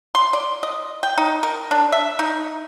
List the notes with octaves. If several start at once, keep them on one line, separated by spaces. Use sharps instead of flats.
C6
D5
D#5
G5
D#4
A#4
D4
E5
D#4